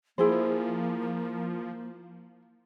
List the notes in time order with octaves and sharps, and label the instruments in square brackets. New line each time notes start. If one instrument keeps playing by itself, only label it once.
[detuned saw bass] F3 [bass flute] A#3 [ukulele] E4 G#4 C5